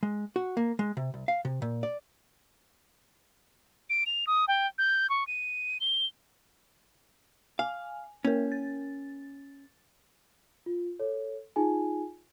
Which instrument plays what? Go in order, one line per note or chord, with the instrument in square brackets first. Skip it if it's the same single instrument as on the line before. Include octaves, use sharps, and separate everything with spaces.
[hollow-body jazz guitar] G#3
F#4
A#3
G#3
C3
C2
F5
C3
A#2
D5
[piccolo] D7
F7
D#6
G5
G6
C#6
D#7
G7
[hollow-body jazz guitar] F5 [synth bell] G#5
[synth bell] A#3 A#4 [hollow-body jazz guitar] C#4
[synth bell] A6
[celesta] F4
A4 C#5
D#4 F4 G#4 G#5